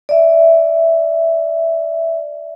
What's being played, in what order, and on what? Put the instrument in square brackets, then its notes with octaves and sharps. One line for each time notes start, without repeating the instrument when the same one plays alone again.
[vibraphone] D5 E5